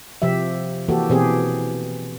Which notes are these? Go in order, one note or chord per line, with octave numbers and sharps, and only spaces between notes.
C3 F3 G4 E5
E3 A#3 F#4 G4 A4
B2 E3 C4 G4 G#4